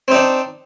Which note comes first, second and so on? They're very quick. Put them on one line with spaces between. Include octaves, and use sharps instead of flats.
C4 D#4 D4